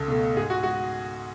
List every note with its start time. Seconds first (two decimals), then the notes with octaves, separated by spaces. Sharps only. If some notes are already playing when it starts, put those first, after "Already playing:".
Already playing: C#2 A4
0.08 B2 A3
0.37 G#2 G#4
0.50 F#4
0.63 G#3 F#4